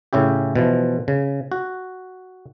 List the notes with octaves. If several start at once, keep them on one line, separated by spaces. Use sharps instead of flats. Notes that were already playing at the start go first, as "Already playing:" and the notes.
A2 C#3 C#4 E4 G4
B2 E3 F3
C#3
F#4